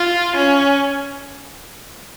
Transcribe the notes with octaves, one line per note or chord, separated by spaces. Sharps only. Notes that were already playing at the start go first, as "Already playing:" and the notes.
Already playing: F4
C#4